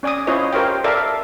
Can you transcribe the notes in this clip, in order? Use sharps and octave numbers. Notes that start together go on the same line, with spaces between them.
C#4 D5 G#5 D6 D#6
C#4 E4 F4 C5 C#5 D#5
G4 A#4 C5 C#5 F5 G5
A4 A#4 D5 E5 F5 A5